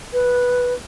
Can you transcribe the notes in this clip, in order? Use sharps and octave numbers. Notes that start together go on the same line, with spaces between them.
B4